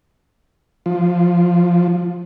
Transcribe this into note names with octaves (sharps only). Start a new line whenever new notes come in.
F3